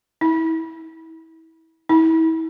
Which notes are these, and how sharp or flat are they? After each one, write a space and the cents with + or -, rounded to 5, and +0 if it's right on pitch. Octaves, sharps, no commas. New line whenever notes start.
E4 -30
E4 -35